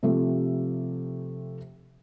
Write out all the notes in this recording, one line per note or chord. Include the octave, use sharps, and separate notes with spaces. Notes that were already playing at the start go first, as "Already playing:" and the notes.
C3 F3 A3 F4 G4 A4